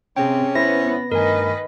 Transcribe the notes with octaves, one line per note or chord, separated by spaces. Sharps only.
C3 C4 C#4 G#4 G5
B3 E4 C5 E5 A#6
G2 D#3 A3 A#4 B4 D#5 G#5